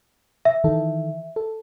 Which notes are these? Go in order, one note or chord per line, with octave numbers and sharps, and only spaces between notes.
E5
D#3 E3 A4
A4